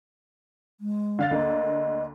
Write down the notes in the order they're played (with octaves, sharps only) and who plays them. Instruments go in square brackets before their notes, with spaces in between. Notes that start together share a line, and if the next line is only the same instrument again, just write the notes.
[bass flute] G#3
[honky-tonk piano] D3 F5 A6
[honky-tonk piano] D2 D3 A#3 [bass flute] D#5